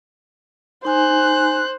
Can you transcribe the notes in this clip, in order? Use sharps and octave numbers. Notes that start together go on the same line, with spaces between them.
D#4 C5 G#5 F#6